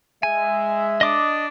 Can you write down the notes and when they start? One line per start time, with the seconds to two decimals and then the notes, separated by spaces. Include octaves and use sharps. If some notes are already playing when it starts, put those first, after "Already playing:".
0.23 G#3 E5 G#5
1.01 D4 D#5 D6 D#6